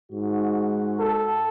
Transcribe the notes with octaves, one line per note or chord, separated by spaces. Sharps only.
G#2 F#4
A4